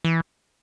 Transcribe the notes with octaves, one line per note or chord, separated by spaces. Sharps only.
E3